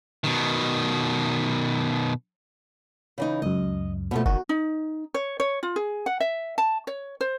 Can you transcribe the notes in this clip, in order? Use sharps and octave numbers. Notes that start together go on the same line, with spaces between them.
B2 D#3
C#3 E3 D#4
C#2 F#2 D#5
B2 F3 A3
F#1 D#3 F#4
D#4
C#5
C#5
F4
G#4
F#5
E5
A5
C#5
C5